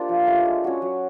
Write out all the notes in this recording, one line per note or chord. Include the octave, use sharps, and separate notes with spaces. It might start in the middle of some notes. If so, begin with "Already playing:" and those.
Already playing: A#3 D4 F4 G4 C5
F3
A3 D4 G4
G#3
C#4 F#4
F#3